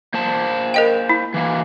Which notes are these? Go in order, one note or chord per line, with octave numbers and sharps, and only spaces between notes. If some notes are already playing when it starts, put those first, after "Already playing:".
A#3 C5 A5
A#4 D#5 G5
E4
E3 A#3